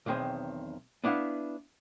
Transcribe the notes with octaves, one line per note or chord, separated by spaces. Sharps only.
B1 E2 D#3 C4 G#4
B3 D4 E4 F5 F#5